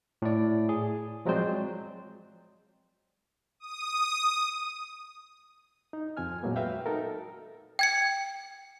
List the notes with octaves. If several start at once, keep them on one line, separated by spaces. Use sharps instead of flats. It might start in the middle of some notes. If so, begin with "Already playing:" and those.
A2 E4 D5
G#4
F3 F#3 G#3 C4 C5 D5
D#6
D#4
F2 F3 C4 G#5 F6
A#2 F#3 G#3 A#3 B3
F#4 B4 E5 F5 G5
D#4 F#4 A4 A#4
G5 G#6 C#7